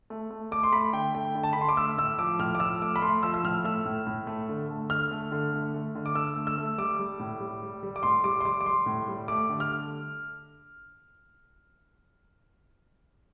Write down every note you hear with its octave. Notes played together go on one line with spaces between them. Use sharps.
A3
A3
A3 D6
C6
A3 B5
D3 G5
A3 G5
D3
A5
D3 B5
C6
D6
A3 E6
A2 E6
F3 D6
A2 F6
D6
F3 E6
A3 D6
B5
A3 C6
F3 E6
E6
A2 F6
A3 E6
A2
A2
A3
D3
A3
D3 F6
A3
D3
A3
A3
D3
D6
D3 E6
A3
E6
A3
G3 D6
G3
A2
G3
G3
G3
D6
A2 C6
G3 D6
C6
G3 D6
D6
G3 C6
A2
G3
A3 D6
D3
F6